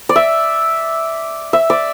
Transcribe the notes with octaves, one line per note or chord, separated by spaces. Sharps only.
D5
E5
E5
D5